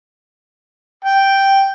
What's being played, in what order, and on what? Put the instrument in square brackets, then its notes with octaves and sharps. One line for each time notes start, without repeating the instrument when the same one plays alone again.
[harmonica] G5